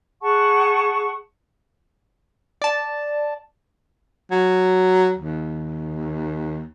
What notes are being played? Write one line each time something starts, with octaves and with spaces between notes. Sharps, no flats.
G#4 F#5 A5 C#6
D5 A5
F#3
D#2